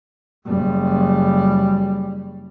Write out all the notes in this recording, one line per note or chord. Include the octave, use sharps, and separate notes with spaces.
F#1 G3